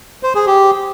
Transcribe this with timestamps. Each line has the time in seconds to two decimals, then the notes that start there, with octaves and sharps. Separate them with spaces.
0.23 C5
0.35 G#4
0.47 G4